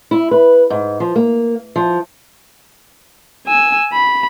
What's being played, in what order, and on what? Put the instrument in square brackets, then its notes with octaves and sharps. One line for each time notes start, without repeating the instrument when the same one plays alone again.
[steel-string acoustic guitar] E4
B4
G#2
F3
A#3
F3
[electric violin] G#5 E6
B5